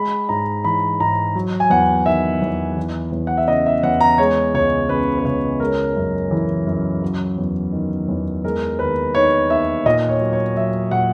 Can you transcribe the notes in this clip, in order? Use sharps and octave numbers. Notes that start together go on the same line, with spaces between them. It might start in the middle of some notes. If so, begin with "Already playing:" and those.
Already playing: G#3 B5
G#2 A#5
E3 B5
G#2 A#5
F#3
G#5
E2 F#5
D#3 E5
E2
E3
E2
F#5
E5
C#3 D#5
E5
E2 F#5
A#5
G#3 C#5
C#2 C#5
C#3 B4
B4
C#2 C#5
G#3 A#4
F#2
E3
F#2
F#3
E2
D#3
E2
G#3 A#4
D#2 B4
D#3 C#5
D#2 E5
A#2 D#5
C#5
F#3
C#5
F#3 E5
A#2 F#5